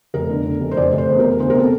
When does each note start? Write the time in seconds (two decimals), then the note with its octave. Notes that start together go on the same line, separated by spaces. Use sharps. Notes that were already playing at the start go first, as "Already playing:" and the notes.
0.14 F1 A#4
0.30 D3
0.46 D3
0.61 F1
0.71 C5
0.77 F1 D5
0.93 F1
0.98 C5
1.09 E2
1.19 E2 A#4
1.40 D2 C5
1.50 A#4
1.55 C3 A4